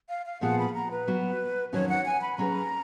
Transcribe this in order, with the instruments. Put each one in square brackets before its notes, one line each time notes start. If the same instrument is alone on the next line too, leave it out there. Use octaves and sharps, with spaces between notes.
[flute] F5
F5
[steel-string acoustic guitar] A#2 F3 B3 F4 G#4 [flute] F#5
[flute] B5
A#5
B4
[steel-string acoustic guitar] F#3 B3 F#4
[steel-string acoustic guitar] F2 D#3 F#3 C#4 F#4 [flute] C#5
[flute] F#5
G#5
B5
[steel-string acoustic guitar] F#3 C#4 G#4 B4 [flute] A#5